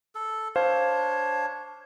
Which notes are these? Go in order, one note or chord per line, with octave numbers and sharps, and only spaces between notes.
A4
D4 C5 C#5 F5